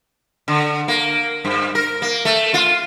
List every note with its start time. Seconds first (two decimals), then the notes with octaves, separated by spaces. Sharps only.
0.48 D3
0.88 A#3
1.45 G2
1.75 A#4
2.02 A#3
2.25 A3
2.54 F4